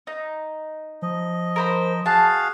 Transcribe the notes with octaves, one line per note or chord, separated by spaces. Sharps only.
D#4
F3 D#5
A#4 C5 B5
F#4 G#4 F5 A5